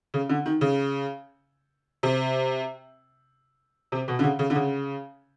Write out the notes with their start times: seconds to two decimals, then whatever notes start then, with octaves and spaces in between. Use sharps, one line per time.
0.14 C#3
0.29 D3
0.46 D#3
0.61 C#3
2.03 C3
3.92 C3
4.08 B2
4.19 D3
4.24 C#3
4.39 C#3
4.50 D3
4.56 C#3